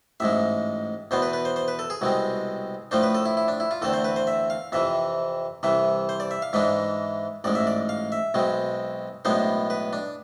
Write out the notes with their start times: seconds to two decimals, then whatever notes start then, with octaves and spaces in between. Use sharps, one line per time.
0.20 A1 G#2 G#3 E5
1.11 E2 B2 B3 C5
1.22 B4
1.33 B4
1.45 C5
1.56 C5
1.68 B4
1.79 A4
1.90 G#4
2.01 C2 B2 G#3 C4
2.91 A2 F3 A3 D4 C5
3.03 B4
3.15 A4
3.26 E4
3.37 E4
3.48 D4
3.60 E4
3.71 F4
3.82 E2 D3 A3 C4 A4
3.93 C5
4.04 B4
4.16 C5
4.27 E5
4.50 F5
4.72 F2 C3 E3 E5
5.63 C2 C3 E3 E5
6.09 C5
6.20 D5
6.31 E5
6.42 F5
6.53 G#2 E3 G#3 D4 E5
7.44 A1 G#2 G#3 D5
7.55 E5
7.67 D5
7.89 F5
8.12 E5
8.34 B1 B2 G#3 C4
9.25 B1 A2 G#3 B3 D4 C5
9.70 B4
9.93 D4